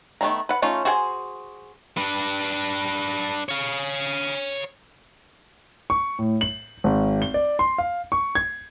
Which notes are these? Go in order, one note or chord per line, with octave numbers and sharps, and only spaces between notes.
D#3 A3 B3 D4 A#5
B4 F#5
A3 C#4 D#4 F4
F#4 G#4 C5 F#5 G#5
D4 B4
C#5 F5
C#6
A2
F#7
G#1
G7
D5
C6
F5
C#6
G#6